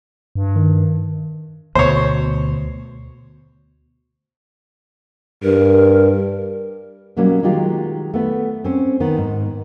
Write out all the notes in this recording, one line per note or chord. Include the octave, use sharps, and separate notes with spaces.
G2
D#3
D2 B2 C5 C#5
G2 A#4
B2 F#3 G3 A#3 C#4
D#3 F#3 G#3 F4 G4
A3 B3
C4 C#4
D#3 B3
G#2